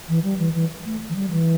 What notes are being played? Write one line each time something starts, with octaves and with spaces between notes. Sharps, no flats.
E3
G3
E3
E3
A3
E3
G3
E3